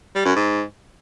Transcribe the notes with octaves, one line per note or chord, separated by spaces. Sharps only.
G3
F#2
G#2